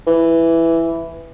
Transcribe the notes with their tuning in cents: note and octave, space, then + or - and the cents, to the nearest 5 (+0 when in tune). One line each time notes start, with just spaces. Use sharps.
E3 +5